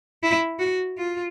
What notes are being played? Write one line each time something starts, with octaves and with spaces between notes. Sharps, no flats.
E4
F#4
F4